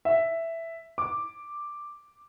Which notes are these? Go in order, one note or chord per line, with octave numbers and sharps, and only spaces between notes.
E5
D6